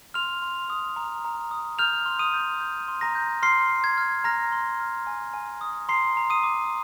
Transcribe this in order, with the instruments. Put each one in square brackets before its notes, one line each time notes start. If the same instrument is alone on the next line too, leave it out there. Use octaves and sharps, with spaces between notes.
[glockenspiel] C6 F6 F7
C6
D#6
A#5
A#5
D#6
F6 G6 F7
C6
D#6 D#7
G6
G6
C6
A#5 A#6
G6
C6 F6 C7
C6
G#6
F6
A#5 F6 A#6
C6
F6
G#5
G#5
D#6
A#5 C6 C7
A#5
D#6 D#7
D6